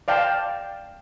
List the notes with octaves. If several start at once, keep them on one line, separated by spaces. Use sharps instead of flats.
D5 F5 G5 A5